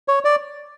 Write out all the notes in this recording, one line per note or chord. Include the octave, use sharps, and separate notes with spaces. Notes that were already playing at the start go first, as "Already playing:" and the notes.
C#5
D5